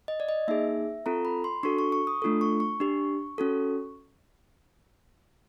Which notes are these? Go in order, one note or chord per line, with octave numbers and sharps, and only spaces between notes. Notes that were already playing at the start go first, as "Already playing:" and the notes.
D#5
D5
D#5
A#3 D#4 G#4 E5
C4 F4 A4 A#5
B5
C6
D4 F#4 A4 C#6
C#6
C#6
D#6
A3 D4 F4 A4
C#6
C#6
D4 G4
C#4 F#4 A4